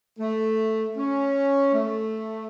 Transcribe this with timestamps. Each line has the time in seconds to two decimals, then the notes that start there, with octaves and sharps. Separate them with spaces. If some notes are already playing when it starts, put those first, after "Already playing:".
0.19 A3
0.96 C#4
1.73 A3